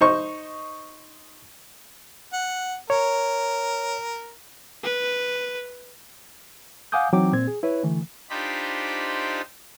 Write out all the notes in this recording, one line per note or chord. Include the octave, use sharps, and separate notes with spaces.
D#4 C5 C#6
F#5
A#4 C#5
B4
F5 F#5 G#5 D6 D#6 G6
E3 F#3 C4 D#4 G5 D6
A#2 C4 G#6
G#4
E4 B4 C#5
D3 E3 A3
D4 D#4 F4 G4 C5 B5